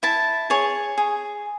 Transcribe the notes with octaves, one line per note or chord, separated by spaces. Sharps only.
E4 A5
G#4 C#5
G#4